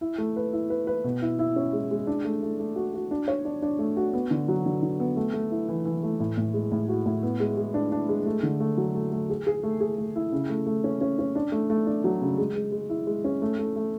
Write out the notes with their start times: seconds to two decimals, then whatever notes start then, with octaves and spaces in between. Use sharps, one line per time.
0.01 E4
0.18 A3
0.36 B4
0.53 E4
0.70 B4
0.87 B4
1.04 B2
1.22 E4
1.39 E4
1.56 C#4
1.73 G#3
1.91 G#3
2.07 D4
2.25 A3
2.43 A3
2.60 A3
2.76 F#4
2.94 F#4
3.11 D4
3.28 C#5
3.45 D4
3.62 D4
3.79 A3
3.97 F#4
4.13 B3
4.31 D3
4.48 F#3
4.66 D3
4.82 D3
5.00 B3
5.16 A3
5.34 A3
5.51 E4
5.69 E3
5.85 E3
6.03 A3
6.20 A2
6.37 A2
6.54 G#3
6.72 A2
6.89 F#4
7.06 A2
7.23 B3
7.40 G#3
7.57 G#3
7.74 D4
7.92 D4
8.09 G#3
8.26 A3
8.43 D3
8.60 A3
8.77 F#3
8.95 A3
9.12 A3
9.30 G#4
9.47 G#4
9.63 A3
9.80 G#4
9.98 A3
10.16 E4
10.32 C#3
10.50 A3
10.66 A3
10.84 C#4
11.01 C#4
11.19 C#4
11.35 D4
11.52 A3
11.70 A3
11.87 D4
12.04 F#3
12.21 C#3
12.38 G#3
12.56 G#3
12.72 G#3
12.90 E4
13.07 G#3
13.24 C#4
13.42 A3
13.59 A3
13.76 A3